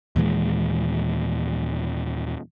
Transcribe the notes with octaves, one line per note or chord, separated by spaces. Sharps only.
D#2 A#2 E3 G#3